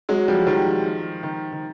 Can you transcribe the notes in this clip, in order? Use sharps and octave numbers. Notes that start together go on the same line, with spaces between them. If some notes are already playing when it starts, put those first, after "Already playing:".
F#3 G#3
F3 G3
D#3 F3
D#3
D#3